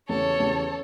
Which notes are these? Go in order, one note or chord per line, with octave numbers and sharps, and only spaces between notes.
E2 C#3 G3 C#4 A4 C#5
E2 C#3 G3 C#4